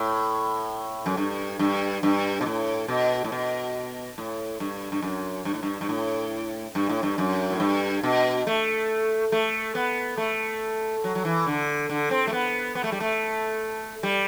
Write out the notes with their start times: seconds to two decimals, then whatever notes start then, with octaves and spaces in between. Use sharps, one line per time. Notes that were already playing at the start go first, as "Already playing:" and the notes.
Already playing: A2
1.06 F#2
1.17 G2
1.59 G2
2.03 G2
2.41 B2
2.46 A2
2.88 B2
3.24 A2
3.32 B2
4.18 A2
4.60 G2
4.92 G2
5.02 F#2
5.45 G2
5.54 A2
5.63 G2
5.81 G2
5.89 A2
6.75 G2
6.89 A2
7.03 G2
7.18 F#2
7.50 A2
7.60 G2
8.03 B2
8.47 A3
9.32 A3
9.75 B3
10.18 A3
11.04 F#3
11.15 F#3
11.25 E3
11.46 D3
11.90 D3
12.11 C4
12.27 A3
12.33 B3
12.75 B3
12.84 A3
12.92 G3
13.00 A3
14.03 G3